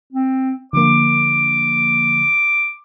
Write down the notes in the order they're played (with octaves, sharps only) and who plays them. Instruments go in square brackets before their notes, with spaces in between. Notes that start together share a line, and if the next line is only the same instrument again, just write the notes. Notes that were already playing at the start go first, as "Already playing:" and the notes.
[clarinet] C4
[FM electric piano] D3 F3 A#3 [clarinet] D6